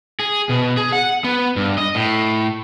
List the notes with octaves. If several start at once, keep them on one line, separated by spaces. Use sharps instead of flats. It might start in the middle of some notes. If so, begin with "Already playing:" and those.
G#4
B2
G#4
F#5
B3
G2
D#5
A2